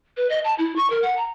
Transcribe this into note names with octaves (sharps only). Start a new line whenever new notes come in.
B4
D#5
A5
E4
C#6
A#4
F#5
A#5